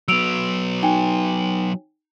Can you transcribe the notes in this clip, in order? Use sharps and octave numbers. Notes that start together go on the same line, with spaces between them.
F#3 B3 E6 D7 F7
D#4 G5 G#5